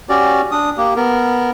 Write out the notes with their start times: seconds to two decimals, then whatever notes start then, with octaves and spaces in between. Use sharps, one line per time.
0.09 C#4 F#4 G4 D5
0.51 D4 D#6
0.78 A#3 G4
0.96 B3 A#4